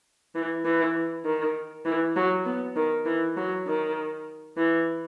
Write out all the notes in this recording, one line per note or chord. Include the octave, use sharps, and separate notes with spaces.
E3
E3
D#3
E3
F#3
B3
D#3
E3
F#3
D#3
E3